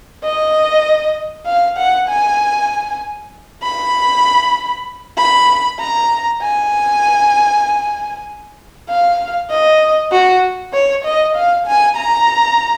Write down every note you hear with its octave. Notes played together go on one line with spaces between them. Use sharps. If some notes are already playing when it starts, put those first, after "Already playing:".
D#5
F5
F#5
G#5
B5
B5
A#5
G#5
F5
D#5
F#4
C#5
D#5
F5
G#5
A#5